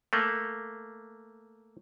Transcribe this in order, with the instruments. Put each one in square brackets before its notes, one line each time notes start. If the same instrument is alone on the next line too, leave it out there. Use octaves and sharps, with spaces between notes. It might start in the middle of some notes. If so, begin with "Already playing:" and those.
[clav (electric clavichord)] A3 A#3